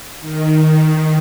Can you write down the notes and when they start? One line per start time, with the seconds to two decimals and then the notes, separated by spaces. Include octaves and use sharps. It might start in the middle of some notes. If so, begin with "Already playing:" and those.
0.21 D#3